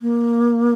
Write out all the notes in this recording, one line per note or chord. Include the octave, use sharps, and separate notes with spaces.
A#3